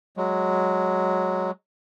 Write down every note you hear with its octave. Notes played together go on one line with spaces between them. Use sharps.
F#3 G#3